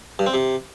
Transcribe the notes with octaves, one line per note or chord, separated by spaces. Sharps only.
G2
C4
C3